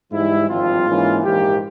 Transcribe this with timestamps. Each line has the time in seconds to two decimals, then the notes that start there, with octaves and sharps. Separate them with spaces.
0.12 G#2 E3 G3 E4
0.49 G#1 G2 F3 C4 F4
0.86 G#2 E3 A#3 C#4
1.23 A#1 G#2 E3 A#3 G4